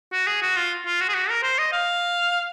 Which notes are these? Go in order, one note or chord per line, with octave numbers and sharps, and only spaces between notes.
F#4
G#4
F#4
F4
F4
F#4
G#4
F#4
A#4
C5
D#5
F5